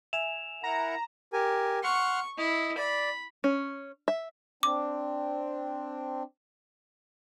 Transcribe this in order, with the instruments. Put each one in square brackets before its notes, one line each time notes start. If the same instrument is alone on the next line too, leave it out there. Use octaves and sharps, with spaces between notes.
[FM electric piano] E5 G#5 [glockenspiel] E7 F7
[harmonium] E4 A#4 F#5 [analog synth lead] A#5
[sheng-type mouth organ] G4 A#4 G#5
[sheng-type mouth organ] F#5 C6 F6 [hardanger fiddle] C#6
[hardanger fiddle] E4 [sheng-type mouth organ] D#5
[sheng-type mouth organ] D5 [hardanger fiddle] B5
[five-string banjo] C#4
E5
[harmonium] C4 D4 [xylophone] D6